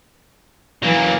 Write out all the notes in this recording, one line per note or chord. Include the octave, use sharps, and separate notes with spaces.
E3 F#3 A#3